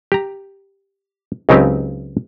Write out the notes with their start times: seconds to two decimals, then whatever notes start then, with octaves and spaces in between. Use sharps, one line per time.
0.12 G4 A#5
1.49 C#2 C#3 F#3 C4 D#4 G4